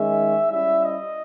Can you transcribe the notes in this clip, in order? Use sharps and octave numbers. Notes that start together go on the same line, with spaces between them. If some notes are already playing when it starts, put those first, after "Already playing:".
Already playing: D#3 G#3 C#4 E5
G3 C#4 E4 E5
D#5